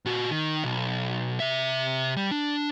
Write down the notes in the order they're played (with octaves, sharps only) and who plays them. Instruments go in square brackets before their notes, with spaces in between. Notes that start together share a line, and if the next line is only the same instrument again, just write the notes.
[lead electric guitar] A#2 F#4
D#3
B1
C3 E5
G3
D4